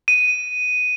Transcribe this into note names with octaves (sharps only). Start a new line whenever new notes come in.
D#7